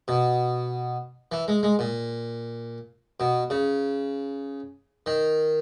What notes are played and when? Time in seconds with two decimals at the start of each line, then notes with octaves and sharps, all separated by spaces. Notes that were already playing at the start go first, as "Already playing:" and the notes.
0.08 B2
1.32 E3
1.48 G#3
1.63 G#3
1.79 A#2
3.20 B2
3.50 C#3
5.06 D#3